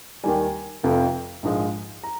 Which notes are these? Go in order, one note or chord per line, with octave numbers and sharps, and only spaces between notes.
D#2 D#3 G3 G#5
F1 F2 C3 F3
A#1 G#2 F3 G#3
A#5